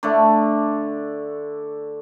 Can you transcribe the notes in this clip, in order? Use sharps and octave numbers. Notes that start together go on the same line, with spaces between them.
D3 A3 D5